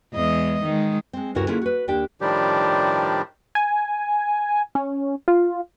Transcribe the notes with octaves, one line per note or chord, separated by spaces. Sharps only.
E2 G#3 D#5
D#3 G#3
G#3 C4
D2 G2 C#3 E4 F#4 A#4
D3 A#3 C#4 E4 F4 G#4
F#4 B4
D#2 A#3 D4 G4 G5
A2 D#3 F3 G3 D4 G4
G#5
C#4
F4